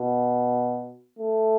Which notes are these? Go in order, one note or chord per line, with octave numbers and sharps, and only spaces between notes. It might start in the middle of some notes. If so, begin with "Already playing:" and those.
Already playing: B2
A3